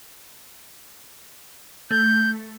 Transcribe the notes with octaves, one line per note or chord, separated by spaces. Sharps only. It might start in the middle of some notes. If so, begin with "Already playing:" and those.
A3 G6